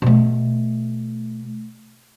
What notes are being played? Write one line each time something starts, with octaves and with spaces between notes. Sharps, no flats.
B2 A3